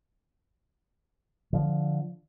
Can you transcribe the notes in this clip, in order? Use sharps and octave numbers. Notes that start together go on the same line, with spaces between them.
D3 F3